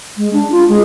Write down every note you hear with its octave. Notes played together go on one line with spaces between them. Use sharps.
G#3
D4
F4
G#3